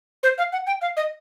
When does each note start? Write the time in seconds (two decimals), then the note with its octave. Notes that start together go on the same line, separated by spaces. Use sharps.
0.23 C5
0.38 F5
0.53 F#5
0.67 G5
0.82 F5
0.97 D#5